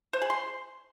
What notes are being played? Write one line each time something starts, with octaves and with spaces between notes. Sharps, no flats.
C5
G#4
C6